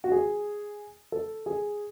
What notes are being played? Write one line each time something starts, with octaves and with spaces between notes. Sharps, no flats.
F#4
G#4
A4
G#4